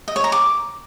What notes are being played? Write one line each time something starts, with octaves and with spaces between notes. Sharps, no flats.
D#5
C#5
A#5
D6